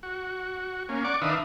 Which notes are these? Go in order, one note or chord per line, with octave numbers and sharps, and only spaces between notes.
F#4
A#3 C#4
D5 F#5 C#6 D6
D#3 D4 B4 E5 F5 D#6